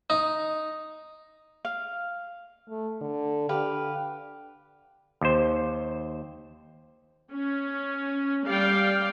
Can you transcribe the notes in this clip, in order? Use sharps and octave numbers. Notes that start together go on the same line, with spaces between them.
D#4
F5
A3
D3
D3 G4 B4 F5
D#2 C5
C#4
G3 D5 F5 G5